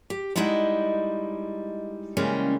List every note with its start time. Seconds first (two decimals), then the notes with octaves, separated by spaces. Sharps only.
0.10 G4
0.36 G3 G#3 D#4 E4 D#5 F#5
2.17 C#3 E3 G3 G#3 A#3 C#4